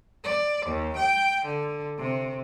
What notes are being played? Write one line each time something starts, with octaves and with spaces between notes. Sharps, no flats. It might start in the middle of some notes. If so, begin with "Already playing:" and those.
D5
D#2
G5
D3
C3